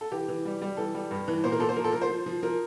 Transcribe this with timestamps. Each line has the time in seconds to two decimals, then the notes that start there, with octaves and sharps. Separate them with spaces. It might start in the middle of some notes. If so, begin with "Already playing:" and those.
0.01 A4
0.12 E3 G4
0.28 E3
0.45 G3
0.62 G3
0.77 E3 A4
0.95 G3
1.11 G2
1.28 E3
1.44 A#2 C5
1.52 A#4
1.59 A#2 A4
1.69 C5
1.76 F3 A#4
1.85 A4
1.92 F3 A#4
2.02 C5
2.09 F3
2.26 F3
2.43 F3 A#4